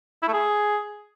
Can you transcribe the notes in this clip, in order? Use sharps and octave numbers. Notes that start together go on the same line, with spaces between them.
E4
A3
G#4